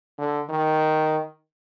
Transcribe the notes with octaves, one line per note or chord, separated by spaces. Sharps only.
D3
D#3